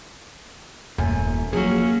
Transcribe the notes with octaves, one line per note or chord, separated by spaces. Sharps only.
D#1 F#2 A3 G#5
F3 F#3 A#3 C#4 F#4 G#4